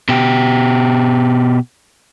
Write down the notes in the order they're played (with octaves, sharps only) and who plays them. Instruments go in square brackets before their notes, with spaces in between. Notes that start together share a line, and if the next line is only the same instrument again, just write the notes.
[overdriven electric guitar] B2 G4